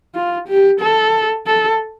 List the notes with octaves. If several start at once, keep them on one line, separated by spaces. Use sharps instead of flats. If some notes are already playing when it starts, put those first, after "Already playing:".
F4
G4
A4
A4